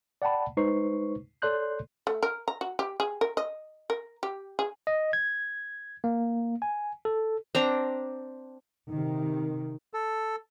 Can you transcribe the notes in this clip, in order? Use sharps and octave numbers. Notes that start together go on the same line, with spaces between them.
D5 F#5 G5 A5 B5
G#3 D#4 B4 C5 C#6 C7
A4 C#5 D5 C6 F#6 G6
A3
A#4
A#5
F#4
G4
G#4
A#4
D#5
A#4
G4
G#4
D#5
G#6
A#3
G#5
A4
C4 D4 A#5
C3 D#3
A4